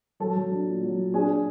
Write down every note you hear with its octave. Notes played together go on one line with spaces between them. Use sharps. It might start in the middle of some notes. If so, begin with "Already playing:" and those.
F#3 A4 A5
F#3
D4
A#2
F#3
A#2
D4 G#4 G#5
D4